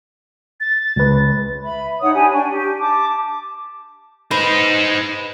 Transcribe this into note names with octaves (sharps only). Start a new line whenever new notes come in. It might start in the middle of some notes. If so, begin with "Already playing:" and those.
A6
C#2 B4
E5 B5
D#4 C#5 F#5 D#6
D4 G4 G#5 B5
D4 G5 G#5 C#6
G4
A5 D6
D#4 B4 C5